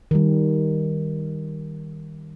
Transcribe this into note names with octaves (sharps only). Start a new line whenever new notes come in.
D#3 G3